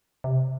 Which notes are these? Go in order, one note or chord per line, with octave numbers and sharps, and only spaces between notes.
C3